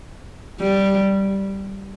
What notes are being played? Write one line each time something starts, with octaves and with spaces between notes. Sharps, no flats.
G3